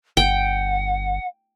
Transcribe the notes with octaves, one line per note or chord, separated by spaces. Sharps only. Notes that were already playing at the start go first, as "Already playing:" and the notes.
G1 F#5 G5